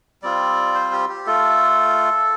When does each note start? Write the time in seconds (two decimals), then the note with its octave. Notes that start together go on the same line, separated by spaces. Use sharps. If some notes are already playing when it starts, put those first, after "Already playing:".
0.22 G3 C4 F4 D5
0.75 C5
0.92 G4
1.09 G4
1.26 A3 F4 A4